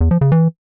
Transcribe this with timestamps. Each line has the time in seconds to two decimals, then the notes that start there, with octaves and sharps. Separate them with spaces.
0.01 E2
0.11 F3
0.21 C#3
0.32 E3